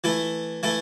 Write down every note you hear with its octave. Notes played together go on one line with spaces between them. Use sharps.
E3 A3 E4 A4
E3 A3 E4 A4